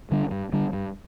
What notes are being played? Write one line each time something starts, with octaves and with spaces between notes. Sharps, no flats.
D3 G3 D4
G2
D3 G3 D4
G2